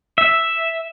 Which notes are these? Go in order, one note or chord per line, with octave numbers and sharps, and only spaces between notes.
E5